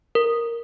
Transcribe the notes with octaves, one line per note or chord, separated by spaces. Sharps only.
A#4